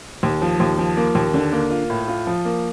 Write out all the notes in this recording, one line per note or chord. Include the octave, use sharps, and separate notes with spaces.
D#2
F3
D#2
F3
A#3
D#2
D3
A#3
F4
A2
F4
F3
A#3